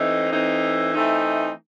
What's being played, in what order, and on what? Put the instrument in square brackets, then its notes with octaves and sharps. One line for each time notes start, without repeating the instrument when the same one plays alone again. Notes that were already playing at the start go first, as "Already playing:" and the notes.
Already playing: [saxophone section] E3 A3 C4 D#4
E3 A3 C4 D#4
E3 A3 C4 D#4